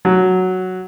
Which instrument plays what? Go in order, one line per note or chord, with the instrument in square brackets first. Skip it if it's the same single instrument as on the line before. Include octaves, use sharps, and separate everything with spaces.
[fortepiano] F#3